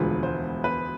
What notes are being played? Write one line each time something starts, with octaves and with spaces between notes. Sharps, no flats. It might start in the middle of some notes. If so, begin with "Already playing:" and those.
Already playing: E1 D2 D3 F3 G#3 B4
C5
B4